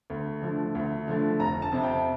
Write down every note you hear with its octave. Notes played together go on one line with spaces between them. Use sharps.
D2
D3 F3 A3
D2
D3 F3 A3
F1 A#5
A5
F2 C3
G5